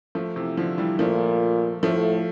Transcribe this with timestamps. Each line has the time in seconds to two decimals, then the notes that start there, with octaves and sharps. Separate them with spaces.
0.15 F3 A3
0.36 C3 E3
0.57 D3 F3
0.78 E3 G3
0.99 A#2 F3 A3
1.83 A2 F3 A3